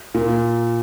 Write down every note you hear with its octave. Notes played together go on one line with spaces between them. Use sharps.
A#2